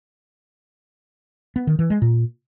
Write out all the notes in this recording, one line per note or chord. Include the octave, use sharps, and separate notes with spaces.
B3
D#3
E3
G#3
A#2